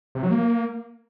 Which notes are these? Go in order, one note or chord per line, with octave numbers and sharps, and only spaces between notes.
C3
F#3
A#3